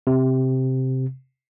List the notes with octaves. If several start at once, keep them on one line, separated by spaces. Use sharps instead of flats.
C3